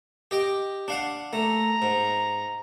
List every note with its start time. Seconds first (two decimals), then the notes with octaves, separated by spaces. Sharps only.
0.31 G4 D#5 G5
0.88 D4 F5 F#5
1.33 A3 A#5
1.82 G#2